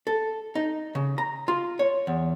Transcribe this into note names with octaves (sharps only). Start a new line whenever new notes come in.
A4
D#4
C#3
A#5
F4
C#5
E2